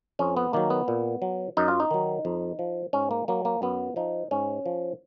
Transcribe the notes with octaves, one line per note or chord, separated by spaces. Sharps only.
F2 C#4
B3
D#3 F#3 A#3
B3
A#2
F#3
F#2 D#4
F4
D#4
D#3 F#3
F2
F3
G#2 C#4
A#3
F#3 A#3
A#3
F#2 B3
F3 D#4
G#2 C#4
F3